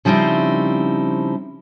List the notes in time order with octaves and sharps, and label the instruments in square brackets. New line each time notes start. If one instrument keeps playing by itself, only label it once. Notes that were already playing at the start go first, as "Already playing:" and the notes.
[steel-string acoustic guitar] C#3 F3 G3 C4 D#4 E4